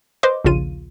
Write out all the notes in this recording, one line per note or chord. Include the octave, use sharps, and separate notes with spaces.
B4 C5 D#5 C6 D6
A#1 D#2 C#3 F4 D#7